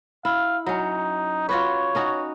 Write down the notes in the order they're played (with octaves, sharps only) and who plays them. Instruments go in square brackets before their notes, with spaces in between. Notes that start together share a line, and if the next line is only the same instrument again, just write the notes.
[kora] E4 [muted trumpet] F5
[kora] F#3 C#4 [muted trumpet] D#4
[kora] F4 F#4 B4 [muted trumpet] C#5
[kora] C#4 D#4 F#4